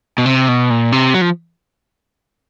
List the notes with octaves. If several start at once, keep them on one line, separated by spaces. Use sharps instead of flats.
B2
C3
B2
A#2
C3
F#3
F3